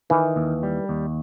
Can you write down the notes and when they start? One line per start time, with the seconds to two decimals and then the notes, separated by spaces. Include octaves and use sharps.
0.10 D#3 E3
0.36 D#2
0.63 G3
0.89 D#2